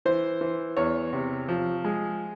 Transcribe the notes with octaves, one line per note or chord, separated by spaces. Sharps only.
E3 C5
E3
E2 C#5
C3
F3
G#3